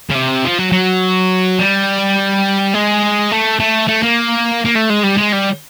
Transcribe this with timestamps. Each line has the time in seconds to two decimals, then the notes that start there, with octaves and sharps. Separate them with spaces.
0.10 C#3
0.15 C3
0.44 F3
0.59 F#3
0.72 F#3
1.59 G3
2.74 G#3
3.31 A3
3.59 A3
3.88 A3
4.03 A#3
4.65 A#3
4.75 A3
4.90 G#3
5.03 G3
5.17 G#3
5.32 G3